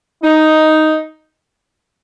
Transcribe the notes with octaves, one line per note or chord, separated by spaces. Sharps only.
D#4